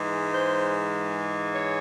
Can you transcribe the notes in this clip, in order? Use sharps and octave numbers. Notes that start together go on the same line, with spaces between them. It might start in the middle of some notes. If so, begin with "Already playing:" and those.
Already playing: G#2 E3 G#3
C5
C#5